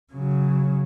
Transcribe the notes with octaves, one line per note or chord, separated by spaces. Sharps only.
C#3 F#3